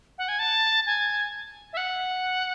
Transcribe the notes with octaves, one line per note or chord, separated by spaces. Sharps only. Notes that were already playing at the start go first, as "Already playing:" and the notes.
F#5
G#5
A5
G#5
E5
F#5